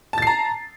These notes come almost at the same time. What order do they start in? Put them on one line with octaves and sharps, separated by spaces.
A5 A6 C7 A#5